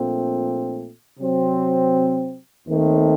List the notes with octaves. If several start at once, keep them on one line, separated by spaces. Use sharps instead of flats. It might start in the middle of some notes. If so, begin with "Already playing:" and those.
Already playing: A#1 A#2 A3 C4
C3 F#3 C4
D#2 D#3 A3 C4